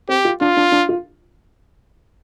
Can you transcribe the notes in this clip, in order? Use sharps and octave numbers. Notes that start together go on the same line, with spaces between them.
C4 G4
F4
D4 F4
D4
D4
F4